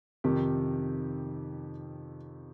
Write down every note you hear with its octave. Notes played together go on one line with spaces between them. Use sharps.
F2 C3 D#3 G4